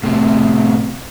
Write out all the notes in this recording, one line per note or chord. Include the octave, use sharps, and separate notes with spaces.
A2 C3